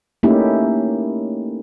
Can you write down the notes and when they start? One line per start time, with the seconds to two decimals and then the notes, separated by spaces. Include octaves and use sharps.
0.23 A3 A#3 C#4 D#4 E4 G4